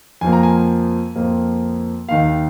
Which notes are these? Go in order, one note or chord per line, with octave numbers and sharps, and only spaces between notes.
F2 F3 A#3 G#5
A#5
G#5
F2 F3 A#3
D#2 D#3 A#3 F5